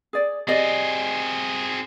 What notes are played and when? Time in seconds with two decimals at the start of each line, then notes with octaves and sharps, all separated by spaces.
0.13 G#4 D5
0.48 C4 G4 G#4 D5 D#5